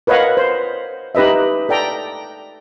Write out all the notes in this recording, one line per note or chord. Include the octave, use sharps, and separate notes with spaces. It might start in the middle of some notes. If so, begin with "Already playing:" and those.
A#4 B4 C#5 D#5 F5 F#5
C5
D#4 G4 B4 D#5 E5
A4 D5 G5 A#5